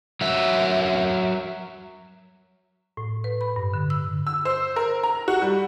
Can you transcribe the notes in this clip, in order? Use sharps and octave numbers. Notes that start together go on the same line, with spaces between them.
F#3 E5
A2
B4
B5
G2
D3
E6
E6
C5
A#4
A#5
F#4
G3